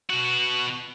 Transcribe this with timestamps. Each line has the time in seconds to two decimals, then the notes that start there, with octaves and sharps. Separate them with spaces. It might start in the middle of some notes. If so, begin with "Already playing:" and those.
0.10 B2 F#4